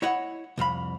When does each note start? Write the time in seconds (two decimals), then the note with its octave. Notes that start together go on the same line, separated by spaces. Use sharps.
0.02 E4 C#5 D#5 F#5
0.58 C2 F2 F5 B5